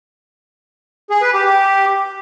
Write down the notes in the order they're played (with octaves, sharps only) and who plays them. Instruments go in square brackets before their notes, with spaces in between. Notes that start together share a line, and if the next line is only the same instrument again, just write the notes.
[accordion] G#4
B4
G4
G4